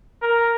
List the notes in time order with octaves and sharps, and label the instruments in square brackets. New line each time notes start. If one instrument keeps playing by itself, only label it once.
[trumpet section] A#4